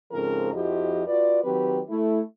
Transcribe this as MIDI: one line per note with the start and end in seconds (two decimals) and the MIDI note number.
0.12 0.52 44
0.12 0.52 49
0.12 0.52 53
0.12 0.52 60
0.12 0.52 69
0.12 0.52 70
0.53 1.04 41
0.53 1.04 53
0.53 1.04 64
0.53 1.04 66
0.53 1.04 67
0.53 1.04 75
1.07 1.41 65
1.07 1.41 66
1.07 1.41 71
1.07 1.41 74
1.43 1.81 51
1.43 1.81 54
1.43 1.81 60
1.43 1.81 67
1.43 1.81 71
1.90 2.20 57
1.90 2.20 64